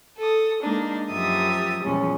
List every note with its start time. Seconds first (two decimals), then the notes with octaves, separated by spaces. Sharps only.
0.17 A4 D#6
0.62 G#3 A#3 D4 D#4
1.11 F#2 F3 G4 E5 D#6 A6
1.83 E2 A#2 F3 G3 G#3 C#4